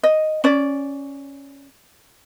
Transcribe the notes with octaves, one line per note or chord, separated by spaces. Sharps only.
D#5
C#4 D5